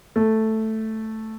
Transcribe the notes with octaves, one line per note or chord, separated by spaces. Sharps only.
A3